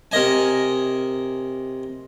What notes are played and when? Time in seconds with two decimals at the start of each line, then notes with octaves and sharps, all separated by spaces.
0.12 C3 A#4 D#5 G#5